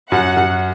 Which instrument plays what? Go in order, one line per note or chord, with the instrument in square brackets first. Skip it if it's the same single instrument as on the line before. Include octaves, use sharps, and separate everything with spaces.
[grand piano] F#2 [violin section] F#5
[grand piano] F#2